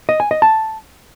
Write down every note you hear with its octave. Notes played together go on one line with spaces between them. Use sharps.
D#5
G#5
D#5
A5